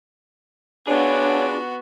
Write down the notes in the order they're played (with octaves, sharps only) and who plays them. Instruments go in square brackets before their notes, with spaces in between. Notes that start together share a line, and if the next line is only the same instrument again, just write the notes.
[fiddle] B3 F#4 [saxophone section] D4 [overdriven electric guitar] F4 G#4 [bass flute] C#5